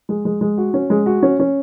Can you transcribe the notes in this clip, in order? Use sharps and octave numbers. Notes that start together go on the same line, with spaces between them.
G#3
G#3
G#3
F#4
C#4
G#3
F#4
C#4
C#4